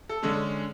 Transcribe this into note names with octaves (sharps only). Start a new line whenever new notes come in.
A4
D3 G#3 C#4